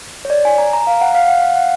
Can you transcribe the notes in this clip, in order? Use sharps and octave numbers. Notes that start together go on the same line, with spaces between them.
C#5
D5
G#5
A#5
A#5
F5
F#5
F5
F#5
F5
F#5